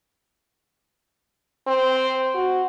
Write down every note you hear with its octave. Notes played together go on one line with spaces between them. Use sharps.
C4
F#4